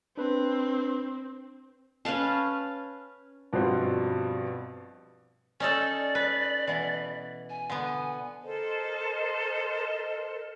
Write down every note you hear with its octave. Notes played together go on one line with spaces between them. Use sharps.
C4 D4 B4
C#4 B4 F5 A5
G2 B2 F3 G3 C4 F#4
C#4 D#4 A4 D5
B4
B2 E3
G#5
D3 B3
A4 A#4 C5 D#5